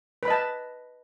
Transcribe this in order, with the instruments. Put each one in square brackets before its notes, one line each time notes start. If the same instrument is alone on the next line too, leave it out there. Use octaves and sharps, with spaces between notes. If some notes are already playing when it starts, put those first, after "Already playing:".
[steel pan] B4
B5
D#5
A5